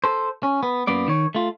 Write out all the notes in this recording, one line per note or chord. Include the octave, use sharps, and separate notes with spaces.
A4 C5
C#4
B3
F#2 A#3 B3 D5
D#3 C#5
A3 F4